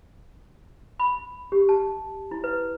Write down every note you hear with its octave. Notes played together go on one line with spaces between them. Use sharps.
B5
G4
A5
E4
B4